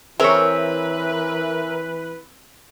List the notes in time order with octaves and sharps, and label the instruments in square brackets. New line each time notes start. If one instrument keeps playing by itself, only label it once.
[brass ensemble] E3 B4 [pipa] C4 [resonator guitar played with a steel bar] G#4 C#5 [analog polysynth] A#4 E5